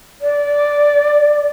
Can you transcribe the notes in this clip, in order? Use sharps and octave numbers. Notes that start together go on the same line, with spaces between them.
D5